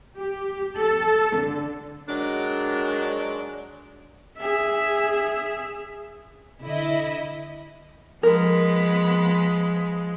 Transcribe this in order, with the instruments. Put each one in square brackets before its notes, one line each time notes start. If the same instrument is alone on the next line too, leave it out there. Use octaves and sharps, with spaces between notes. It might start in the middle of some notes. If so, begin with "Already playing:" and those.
[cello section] G4
A4
D3
[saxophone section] D#3 F#3 G#3 D4
[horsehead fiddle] G#4 E5
[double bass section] D3 [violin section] E4 D#5
[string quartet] F3 [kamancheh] G#3 [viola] B3 B5 [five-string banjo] A#4